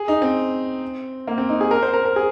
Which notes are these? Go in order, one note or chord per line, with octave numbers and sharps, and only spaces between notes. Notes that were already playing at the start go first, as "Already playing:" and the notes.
Already playing: G#4
D#4
C4
A#3
C4
D#4
G#4
A#4
C5
A#4
A#4
G#4